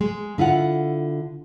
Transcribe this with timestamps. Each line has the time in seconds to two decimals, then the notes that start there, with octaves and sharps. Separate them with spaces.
0.01 G#3
0.38 D3 E4 F4 F#5